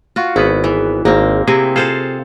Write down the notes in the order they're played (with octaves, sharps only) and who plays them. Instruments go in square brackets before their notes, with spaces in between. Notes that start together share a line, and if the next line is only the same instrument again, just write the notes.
[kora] F4 F#4
[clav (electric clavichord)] G#1 B3 B4 [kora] E4
[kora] E3
[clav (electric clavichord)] G#1 [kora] A#3 C4
[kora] C3 C4 E4 [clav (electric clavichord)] G#4 G#5
[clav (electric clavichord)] F4 G#4 [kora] A4 C5 F5